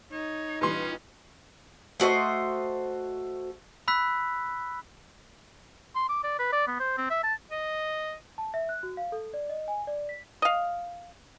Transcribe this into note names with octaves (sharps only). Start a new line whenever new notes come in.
D#4 C#5
A#2 E3 G3 C#4 B4 C6
A3 F#4 C5 D#5
B5 E6 F#6 B6
C6
D6
D5
B4
D5
B3
C5
C4
E5
A5
D#5
A5
E5
F#6
F#4
F5
A4
D5
D#5
G#5
D5
B6
D#5 F5